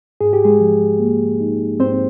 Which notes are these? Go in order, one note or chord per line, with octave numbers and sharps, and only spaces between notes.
G#2 G#4
G4
G#3 G#4
F3
A#3
D#4
G#2 C4 C5